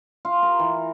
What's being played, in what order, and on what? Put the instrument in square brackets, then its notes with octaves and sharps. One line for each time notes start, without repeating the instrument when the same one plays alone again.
[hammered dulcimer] F4
A#4
E3